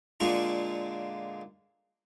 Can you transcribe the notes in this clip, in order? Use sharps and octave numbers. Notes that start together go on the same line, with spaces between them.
A#2 D3 G#3 F4 C#6